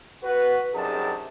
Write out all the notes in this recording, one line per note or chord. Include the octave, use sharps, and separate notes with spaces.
F#4 B4
C2 F#2 D#4 G4 G#4 A5